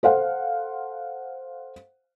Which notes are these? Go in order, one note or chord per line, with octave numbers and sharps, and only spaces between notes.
A4 C5 F5 F#5